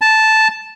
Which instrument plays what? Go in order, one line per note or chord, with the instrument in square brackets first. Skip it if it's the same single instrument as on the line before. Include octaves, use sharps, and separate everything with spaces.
[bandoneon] A5